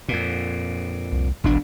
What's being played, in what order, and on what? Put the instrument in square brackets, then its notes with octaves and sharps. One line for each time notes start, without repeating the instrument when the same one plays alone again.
[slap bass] F2 A#2
[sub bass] C2
[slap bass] E1 D2 D4 [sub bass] A1